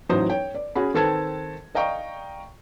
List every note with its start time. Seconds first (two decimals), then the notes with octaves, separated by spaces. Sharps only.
0.09 A1 E3 F#3 D#4 C5 D#6
0.30 C#5 G5
0.55 D5
0.75 C#4 F#4 G#4 B5
0.94 D#3 C4 A4 B4 A5 G#6
1.75 D5 D#5 F5 G5 A#5 C#6